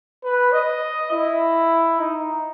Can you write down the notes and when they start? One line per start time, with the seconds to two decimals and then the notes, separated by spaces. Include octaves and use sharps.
0.23 B4
0.52 D#5
1.12 E4
1.99 D#4